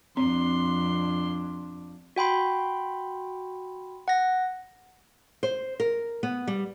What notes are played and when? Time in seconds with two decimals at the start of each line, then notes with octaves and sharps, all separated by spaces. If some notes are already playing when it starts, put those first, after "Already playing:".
0.17 F2 C4 D4 C6
2.16 F#4 G5 B5 C6
4.08 F#5 A#6
5.43 C5
5.80 A#4
6.23 B3
6.47 G3